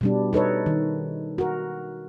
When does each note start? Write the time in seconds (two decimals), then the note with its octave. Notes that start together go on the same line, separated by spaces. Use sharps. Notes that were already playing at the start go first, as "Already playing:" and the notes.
0.01 B2 G3 D4
0.33 D#4 A4 B4 C#5
0.66 D#3
1.38 F#4 A#4